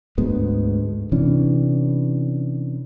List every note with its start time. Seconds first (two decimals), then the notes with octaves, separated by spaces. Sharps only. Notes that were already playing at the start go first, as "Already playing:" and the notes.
0.18 D2 G#2 G#3 B3
1.12 C3 E3 C#4 D4